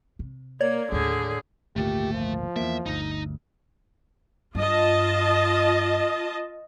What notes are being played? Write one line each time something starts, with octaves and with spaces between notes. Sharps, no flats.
C3
A#3 A#4 C#5 D5 G#6
D#2 A2 D3 G#4
G#1 D2 A#2 A3 G4
F3
E2 A#3 E5
G1 D2 D#4
G2 F4 D#5 A5